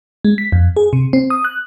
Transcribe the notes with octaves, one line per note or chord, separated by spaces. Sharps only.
G#3
B6
F2
G#4
C3
C4
D#6
F#6